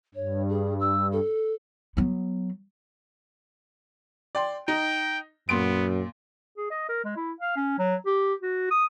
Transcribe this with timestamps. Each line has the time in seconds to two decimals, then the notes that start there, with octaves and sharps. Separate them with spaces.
0.15 G2 C#5
0.48 G#4
0.80 E6
1.12 A4
1.97 F#3 B3
4.35 D5 G5 C6
4.68 D#4 G5
5.49 F#2 A#2 B3 C6 D7
6.57 G#4
6.71 D#5
6.89 A#4
7.05 G#3
7.17 E4
7.41 F5
7.57 C#4
7.79 F#3
8.06 G4
8.42 F#4
8.71 D#6